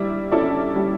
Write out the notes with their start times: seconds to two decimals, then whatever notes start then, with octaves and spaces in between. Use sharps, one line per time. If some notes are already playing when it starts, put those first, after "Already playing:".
Already playing: G3 E4 D5
0.32 C#4 E4 A4 D5
0.76 G3